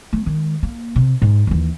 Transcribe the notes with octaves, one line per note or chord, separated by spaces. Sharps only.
A3
D#3 G#3
A#3
C3
G#2
D#2 E3